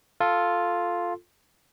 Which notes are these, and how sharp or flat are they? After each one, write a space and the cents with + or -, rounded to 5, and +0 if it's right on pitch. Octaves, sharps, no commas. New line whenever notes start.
F4 +0 A4 +0